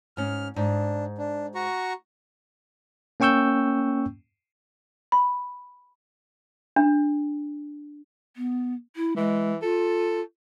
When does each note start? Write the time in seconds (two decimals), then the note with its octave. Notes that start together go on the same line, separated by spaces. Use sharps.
0.17 G#2 C#4 F6
0.56 G#2 D4
1.18 D4
1.55 F#4 A#5 C#6
3.20 A#3 C#4 G5 C#6 E6 G6
5.12 B5
6.76 D4
8.37 B3
8.96 E4
9.17 E3 G#3
9.62 F4 A4